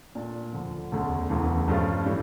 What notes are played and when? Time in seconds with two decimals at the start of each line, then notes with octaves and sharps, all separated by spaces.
0.15 A#2 A3 D4 A4
0.53 D2 D3 F3
0.91 E1 D2 D3 A3 C#4
1.29 E1 D2 C#3 E3 A3
1.68 G2 F3 A3 C#4 F4
2.06 A2 E3 G3